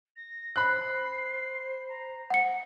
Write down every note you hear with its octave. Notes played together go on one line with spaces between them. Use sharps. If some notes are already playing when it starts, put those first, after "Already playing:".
A#6
C5 B5 F#6 C7
A#5
F#5 C#7